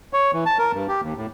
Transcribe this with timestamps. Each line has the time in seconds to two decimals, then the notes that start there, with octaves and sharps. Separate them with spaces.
0.13 C#5
0.33 E3
0.46 A5
0.59 A#4
0.74 G2
0.88 G4
1.02 D#2
1.17 A2